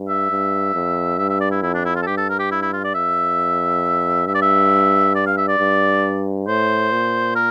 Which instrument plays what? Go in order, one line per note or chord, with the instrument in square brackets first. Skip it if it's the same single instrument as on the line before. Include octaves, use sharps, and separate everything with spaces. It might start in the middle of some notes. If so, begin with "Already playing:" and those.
Already playing: [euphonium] G2
[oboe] E5
[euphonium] G2
F2
[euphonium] G2 [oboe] E5
[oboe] E5
D5
E4
[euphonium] F2 [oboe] E4
[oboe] D4
E4
F4
A4
[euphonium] G2 [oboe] G4
[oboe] A4
A#4
G4
E4
E4
F4
D5
[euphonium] F2 [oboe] E5
[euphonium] G2 [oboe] E5
[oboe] D5
E5
D5
F5
E5
D5
[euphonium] G2
[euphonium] A2 [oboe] C5
[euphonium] A#2
[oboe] A#4